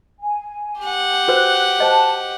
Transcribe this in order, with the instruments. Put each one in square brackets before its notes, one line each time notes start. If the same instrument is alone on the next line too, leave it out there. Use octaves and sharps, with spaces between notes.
[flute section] G#5
[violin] G4 F#5
[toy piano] F#4 B4 C5 [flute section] F#6
[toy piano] C5 D#5 [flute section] A5